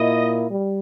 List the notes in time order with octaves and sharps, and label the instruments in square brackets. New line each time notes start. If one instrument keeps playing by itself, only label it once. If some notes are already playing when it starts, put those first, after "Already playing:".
Already playing: [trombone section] A#2 A#3 E4 [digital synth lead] D#5
[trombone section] G3